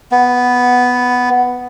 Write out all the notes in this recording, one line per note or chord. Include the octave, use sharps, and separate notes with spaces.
B3